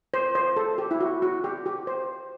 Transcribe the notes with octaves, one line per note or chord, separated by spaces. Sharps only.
C5
C5
A4
G4
E4
F#4
F#4
G4
G4
C5